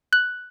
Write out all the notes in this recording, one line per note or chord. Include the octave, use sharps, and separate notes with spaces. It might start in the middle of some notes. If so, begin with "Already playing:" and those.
F#6